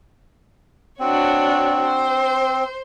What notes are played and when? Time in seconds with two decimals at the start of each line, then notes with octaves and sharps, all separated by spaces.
1.00 C4 D4 F#4 C#5
1.84 C5